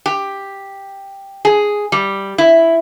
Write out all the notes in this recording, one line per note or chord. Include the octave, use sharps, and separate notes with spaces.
G4
G#4
G3
E4